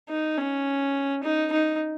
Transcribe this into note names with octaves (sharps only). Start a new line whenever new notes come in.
D#4
C#4
D#4
D#4